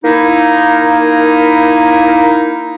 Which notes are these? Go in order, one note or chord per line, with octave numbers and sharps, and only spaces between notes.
A#3 D#4 E4